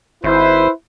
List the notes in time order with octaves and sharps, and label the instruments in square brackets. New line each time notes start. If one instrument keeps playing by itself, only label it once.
[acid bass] G#1 [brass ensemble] E4 B4 C5